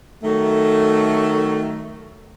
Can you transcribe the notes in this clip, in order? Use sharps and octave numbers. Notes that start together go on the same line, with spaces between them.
D#3 F#3 A3